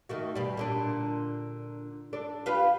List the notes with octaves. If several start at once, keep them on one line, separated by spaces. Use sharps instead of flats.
D#3 A3 F#4
B2 G3
A#2 D3 D4
D4 A4 D5
F4 G4 B4